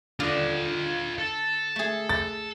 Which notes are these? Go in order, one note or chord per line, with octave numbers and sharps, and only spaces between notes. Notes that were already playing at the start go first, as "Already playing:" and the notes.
D3 F4 D#5
A4
A3 G#4
A6